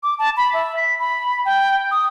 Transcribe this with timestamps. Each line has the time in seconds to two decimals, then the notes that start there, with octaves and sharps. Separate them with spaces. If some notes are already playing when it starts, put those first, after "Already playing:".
0.03 D6
0.19 A5
0.37 B5
0.53 E5
0.77 B6
0.99 B5
1.45 G5
1.91 D#6